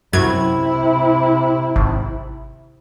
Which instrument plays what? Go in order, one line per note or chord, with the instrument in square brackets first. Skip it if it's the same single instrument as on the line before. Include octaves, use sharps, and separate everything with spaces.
[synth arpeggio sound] F#2 F#3 G#6 [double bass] C3 E4
[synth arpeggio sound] G#1